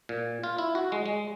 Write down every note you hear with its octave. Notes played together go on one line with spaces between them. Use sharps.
A#2
F4
E4
F#4
G#3
G#3